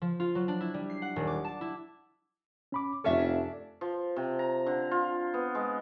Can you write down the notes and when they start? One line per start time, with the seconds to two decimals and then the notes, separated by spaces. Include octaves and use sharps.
0.02 F3
0.20 F4
0.35 F#3
0.48 D4
0.61 E4
0.74 G3
0.90 C7
1.02 F#5
1.16 D#1
1.27 D6
1.45 A5
1.61 E4
2.72 C#4 B5 D6
3.04 F1 F2 C#4 D4 A4 E5
3.81 F3
4.16 C3
4.39 A#5
4.66 D3
4.91 F4
5.34 B3
5.55 G#3